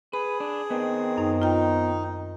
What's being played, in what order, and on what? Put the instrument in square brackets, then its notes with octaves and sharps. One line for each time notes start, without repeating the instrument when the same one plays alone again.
[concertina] G#4 [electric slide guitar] B4 [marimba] B5
[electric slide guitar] D4
[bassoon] D#3 [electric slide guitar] B3 C4
[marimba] F#2 D#4
[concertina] D#4 [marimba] F4 G5